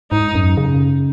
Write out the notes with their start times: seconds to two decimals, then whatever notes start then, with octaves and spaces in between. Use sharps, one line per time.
0.11 G#2 D#4
0.35 F#2
0.57 C#3